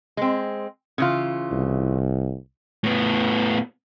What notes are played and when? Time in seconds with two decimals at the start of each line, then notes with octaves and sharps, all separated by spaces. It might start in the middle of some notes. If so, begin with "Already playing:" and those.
0.17 G#3 C4
0.98 C#3 E3 F4
1.52 C2
2.84 A2 B3